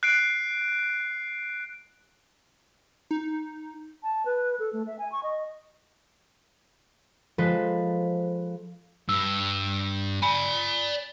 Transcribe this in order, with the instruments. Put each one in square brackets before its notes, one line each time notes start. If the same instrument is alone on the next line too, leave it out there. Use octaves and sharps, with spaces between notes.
[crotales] F#6 C7 D7
[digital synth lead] D#4
[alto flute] A5
B4
A4
A3
E5
G#5
C#6
D#5
[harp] F3 G#3 A4 B4 C5
[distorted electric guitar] G2 [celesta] E6
[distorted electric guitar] D5 G#5 [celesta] B5